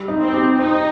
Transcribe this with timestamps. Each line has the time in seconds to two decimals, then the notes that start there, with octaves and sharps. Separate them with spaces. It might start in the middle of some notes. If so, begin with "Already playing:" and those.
Already playing: G3
0.08 D#4
0.21 C4
0.33 G4
0.59 D#4 C5